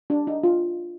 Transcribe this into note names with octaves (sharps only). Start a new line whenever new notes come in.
D4
D#4
F4